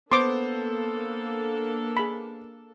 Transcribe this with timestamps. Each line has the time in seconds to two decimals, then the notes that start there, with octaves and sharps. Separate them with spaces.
0.12 A#3 B3 D4 A4 C5 C6 D6
1.97 G#4 B5